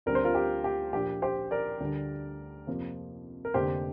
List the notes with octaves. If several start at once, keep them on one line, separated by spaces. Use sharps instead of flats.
D2 D3 G3 C4 A#4
C5
F4 A#4
G4
G4
A#1 A#2 F3 G4
G4 C5
A#4 D5
D2 D3 G3 D4
F2 C3 F3 A#3
A#4
F1 F2 D3 A#3 G4 C5